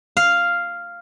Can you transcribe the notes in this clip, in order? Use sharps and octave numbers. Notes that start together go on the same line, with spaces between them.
F5